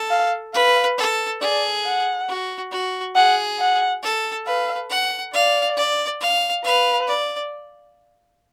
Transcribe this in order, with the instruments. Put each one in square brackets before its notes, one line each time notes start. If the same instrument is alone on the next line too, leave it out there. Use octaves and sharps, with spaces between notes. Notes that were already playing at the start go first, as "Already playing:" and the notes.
Already playing: [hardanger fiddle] A4
[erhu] F5
[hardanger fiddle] B4 [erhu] F5
[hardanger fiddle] A4
[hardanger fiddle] G#4 [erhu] D5
[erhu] F#5
[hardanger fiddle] F#4
F#4
[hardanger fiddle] G#4 [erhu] F#5
[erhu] F#5
[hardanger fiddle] A4
[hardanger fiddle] B4 [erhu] F5
[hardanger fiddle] F#5
[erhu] D5 [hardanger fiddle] F5
[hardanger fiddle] D5
F5
[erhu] B4 [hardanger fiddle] F5
[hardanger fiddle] D5